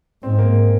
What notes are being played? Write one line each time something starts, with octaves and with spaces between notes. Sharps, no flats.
G#2 C4
A#3